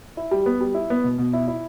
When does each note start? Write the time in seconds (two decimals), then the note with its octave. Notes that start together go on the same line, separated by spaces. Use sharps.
0.17 E4
0.31 G3
0.46 B3
0.61 G3
0.74 E4
0.90 B3
1.04 B2
1.18 B2
1.33 E4
1.48 E4